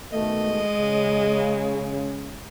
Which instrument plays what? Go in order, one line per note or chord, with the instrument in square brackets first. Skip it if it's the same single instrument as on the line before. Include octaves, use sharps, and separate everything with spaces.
[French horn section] B2 D#3 A3 [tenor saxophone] D#5
[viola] G#3
[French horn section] C#3